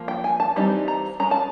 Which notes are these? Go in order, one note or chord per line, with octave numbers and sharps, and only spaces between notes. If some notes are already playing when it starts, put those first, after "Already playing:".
Already playing: F3 A#3
G5
G#5
A5
E3 G3 C4 D#4
A#5
G#3 C#4 A#5
A5